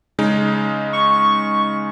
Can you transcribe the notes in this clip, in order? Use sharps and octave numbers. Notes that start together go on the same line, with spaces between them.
C#3 G#3 D#4
C#6